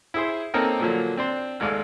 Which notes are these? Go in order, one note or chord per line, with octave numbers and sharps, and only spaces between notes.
E4 G#4 C5
A#3 C4 C#4 D#4 A4 A#4
A#2 D3 F3 F#3 A#3
C4 D4 C5
G#1 D#2 G#3 A3 D5 F5